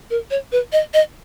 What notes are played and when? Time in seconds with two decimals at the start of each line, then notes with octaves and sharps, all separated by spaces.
0.10 A#4
0.31 C#5
0.52 B4
0.72 D#5
0.94 D#5